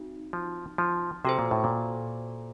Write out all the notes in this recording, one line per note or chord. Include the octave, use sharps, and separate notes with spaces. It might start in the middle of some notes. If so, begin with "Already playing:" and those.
Already playing: C4 D#4 F#4
F3
F3
C3 F#4 A4 C5
A#2
A2
A#2